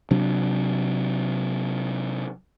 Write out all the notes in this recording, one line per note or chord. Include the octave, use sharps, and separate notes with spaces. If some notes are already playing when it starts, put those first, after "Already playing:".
C3 F#3 D4